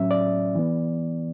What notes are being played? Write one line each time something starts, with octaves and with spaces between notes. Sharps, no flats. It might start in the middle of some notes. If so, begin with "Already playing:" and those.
Already playing: A2 F#3 C#4 E5
D5
E3 B3